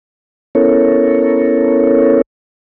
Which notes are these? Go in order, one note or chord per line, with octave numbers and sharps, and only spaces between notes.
B3 C#4 E4 A4 A#4 C#5